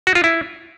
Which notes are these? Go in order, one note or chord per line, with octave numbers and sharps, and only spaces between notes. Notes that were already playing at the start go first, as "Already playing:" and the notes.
F#4
F4
E4